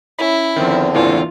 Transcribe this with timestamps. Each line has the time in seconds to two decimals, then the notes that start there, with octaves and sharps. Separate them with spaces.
0.19 C#4 E4 B5
0.56 E2 D3 D#3 F3 C4
0.95 C#2 A2 E3 A#3 D4 F4 G#5